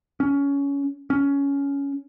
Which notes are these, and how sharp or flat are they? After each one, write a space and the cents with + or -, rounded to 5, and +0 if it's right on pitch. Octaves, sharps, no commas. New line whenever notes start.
C#4 +20
C#4 +15